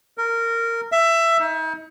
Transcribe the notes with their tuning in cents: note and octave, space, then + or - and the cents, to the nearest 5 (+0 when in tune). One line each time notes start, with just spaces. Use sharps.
A#4 -15
E5 +15
D#4 +40